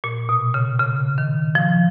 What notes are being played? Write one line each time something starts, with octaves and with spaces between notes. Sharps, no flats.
A#2
B2
C#3
C#3
D#3
F3